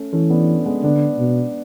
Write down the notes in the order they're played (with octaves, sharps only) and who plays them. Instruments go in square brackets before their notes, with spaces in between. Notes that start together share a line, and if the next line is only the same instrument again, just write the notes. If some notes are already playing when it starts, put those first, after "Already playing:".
Already playing: [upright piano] A3 C#4
[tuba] E3 [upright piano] A3 C#4
[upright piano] B3 D4
G#3 B3
[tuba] D3 [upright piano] B3 D4
[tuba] B2